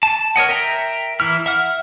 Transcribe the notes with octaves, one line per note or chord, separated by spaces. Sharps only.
A5
A#4 C#5 D#5 F#5
A#4 E5 G5 A#5
E3 E4 F6
E5 F#5 F6